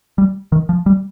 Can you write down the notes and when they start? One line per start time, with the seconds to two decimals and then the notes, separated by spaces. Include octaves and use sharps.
0.18 G3
0.52 D#3
0.69 F3
0.86 G3